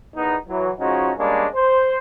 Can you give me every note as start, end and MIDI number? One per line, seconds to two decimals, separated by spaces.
0.16 0.36 40
0.16 0.36 51
0.16 0.36 59
0.16 0.36 63
0.49 0.70 52
0.49 0.70 54
0.79 1.12 53
0.79 1.12 56
0.79 1.12 61
0.79 1.12 63
0.79 1.12 66
1.18 1.46 55
1.18 1.46 56
1.18 1.46 58
1.18 1.46 61
1.18 1.46 62
1.55 1.97 72